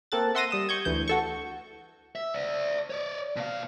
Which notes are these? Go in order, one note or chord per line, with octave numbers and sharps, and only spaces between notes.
A#3 C4 A4 F#6 A6
E5 F#5 C6 E6 A#6 D#7
G3 D#6 E7
C#6 G6 G#6
D2 E3 G6
F#4 A4 C#6
E5
D5 E5
C#5 D5
B2 F5